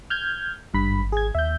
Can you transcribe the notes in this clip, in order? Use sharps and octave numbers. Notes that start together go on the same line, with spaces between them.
F6 G6 G#6
G#1 G2 B5 B6
G#4 G#6
D#2 E5 G6